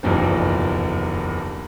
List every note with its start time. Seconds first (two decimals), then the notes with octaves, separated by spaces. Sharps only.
0.03 F#1 B1 E2 G2 F3